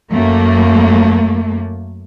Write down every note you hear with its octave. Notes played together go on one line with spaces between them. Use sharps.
F#2 A3 A#3